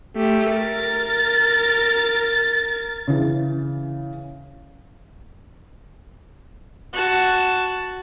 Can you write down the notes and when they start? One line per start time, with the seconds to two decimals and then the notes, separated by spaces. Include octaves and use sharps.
0.16 A3 G4
0.54 A#4 A6
3.08 C#3 E3
6.93 F#4 A5